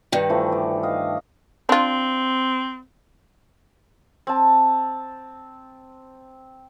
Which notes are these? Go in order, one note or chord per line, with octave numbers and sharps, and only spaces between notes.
G2 D#3
E3 F3 A3
D5
D#5 F5
C4 D4 F4
C4 A5